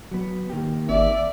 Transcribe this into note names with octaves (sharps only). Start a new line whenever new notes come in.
F#3 B3
D#3 A#3 G4
G#1 D5 E5